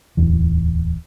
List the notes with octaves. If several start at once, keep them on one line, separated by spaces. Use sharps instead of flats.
D1 E2 E3